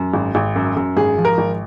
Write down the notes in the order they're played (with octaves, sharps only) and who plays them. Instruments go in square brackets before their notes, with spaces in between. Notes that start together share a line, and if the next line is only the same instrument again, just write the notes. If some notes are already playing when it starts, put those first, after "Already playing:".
Already playing: [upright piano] F#2
G#1
G#1
F#2
F#2
G#1 G#4
F3
A#4
G#1